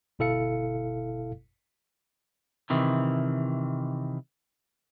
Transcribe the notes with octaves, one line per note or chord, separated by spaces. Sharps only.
G1 B2 E4 A4 F5 C#7
C3 D#3 E3